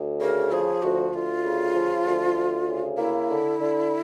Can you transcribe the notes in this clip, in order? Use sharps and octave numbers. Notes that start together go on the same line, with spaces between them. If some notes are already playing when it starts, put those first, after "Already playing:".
Already playing: D2
C#3 A#4
F3 G#4
D2 F#4
D2 F4
C#3
F3
D2
D2
C#3
A#3 E4
D3
D3